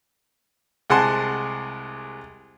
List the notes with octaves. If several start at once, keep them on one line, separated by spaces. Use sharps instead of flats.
C2 G#3 F#5 G#5 A5 C6